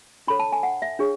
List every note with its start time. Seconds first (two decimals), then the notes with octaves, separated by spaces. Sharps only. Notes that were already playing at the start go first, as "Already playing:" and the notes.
0.27 D4 A4 C#5 B5
0.39 A5
0.52 G#5
0.63 F#5
0.82 E5
0.99 D4 G#4 C#5